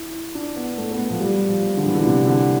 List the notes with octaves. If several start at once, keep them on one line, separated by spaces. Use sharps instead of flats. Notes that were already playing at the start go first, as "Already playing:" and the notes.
Already playing: E4
D4
B3
A3
B3
A3
F3
G3
F3
D3
E3
D3
C3
D3